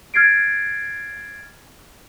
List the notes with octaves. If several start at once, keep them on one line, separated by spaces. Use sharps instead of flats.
F6 G#6 A6 C7 D7